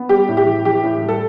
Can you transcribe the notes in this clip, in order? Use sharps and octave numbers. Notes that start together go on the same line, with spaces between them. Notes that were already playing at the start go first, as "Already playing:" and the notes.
Already playing: B3
G3 G4
A2
G4
E3
E3 G4
A2
G3
A4